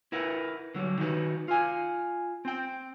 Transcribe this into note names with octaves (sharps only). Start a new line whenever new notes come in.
E4 A#4 B4 F#5
D3 F#3 G3
D#3 D#4 F#4 B4
F4 G#5
C4 G5